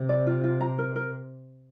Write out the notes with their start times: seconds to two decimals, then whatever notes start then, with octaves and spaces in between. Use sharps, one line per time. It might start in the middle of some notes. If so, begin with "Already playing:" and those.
Already playing: C3
0.09 D5
0.27 F4
0.44 F4
0.61 A#5
0.78 A#4
0.96 A#4